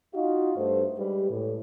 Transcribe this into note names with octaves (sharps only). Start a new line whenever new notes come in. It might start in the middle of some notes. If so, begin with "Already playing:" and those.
D#4 F4 F#4 F5
G2 A3 C5
G3 G#3 G4 B4
A2